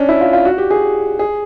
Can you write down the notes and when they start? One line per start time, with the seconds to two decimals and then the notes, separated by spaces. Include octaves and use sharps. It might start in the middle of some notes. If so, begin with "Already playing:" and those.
Already playing: C#4 D4
0.09 E4
0.21 F4
0.33 F4
0.45 F#4
0.58 G4
0.71 G#4
1.19 G#4